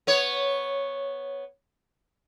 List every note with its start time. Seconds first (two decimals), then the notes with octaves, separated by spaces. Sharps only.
0.07 B3 C#5